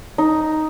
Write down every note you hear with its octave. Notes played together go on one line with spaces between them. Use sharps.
D#4